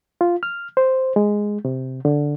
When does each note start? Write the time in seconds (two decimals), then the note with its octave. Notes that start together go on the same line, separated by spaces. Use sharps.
0.21 F4
0.43 F6
0.77 C5
1.16 G#3
1.65 C3
2.05 D3